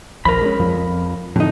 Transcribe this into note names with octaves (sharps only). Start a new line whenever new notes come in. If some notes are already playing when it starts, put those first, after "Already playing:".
A#1 D#2 F3 A#4 B5
G#3 C#4
F2 F3
F2 A2 D3 D#4